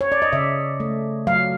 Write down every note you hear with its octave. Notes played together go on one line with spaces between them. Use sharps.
C#5
D5
D#5
C#3 E5
A3
F#3 F5